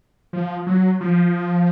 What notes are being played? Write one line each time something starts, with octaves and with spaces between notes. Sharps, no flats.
F3
F#3
F3